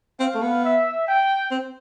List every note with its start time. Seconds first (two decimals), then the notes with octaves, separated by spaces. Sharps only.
0.19 C4 F5
0.35 A3
0.42 B3
0.64 E5
1.07 G5
1.51 C4